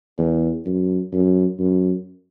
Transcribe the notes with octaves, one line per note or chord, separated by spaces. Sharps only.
E2
F#2
F#2
F#2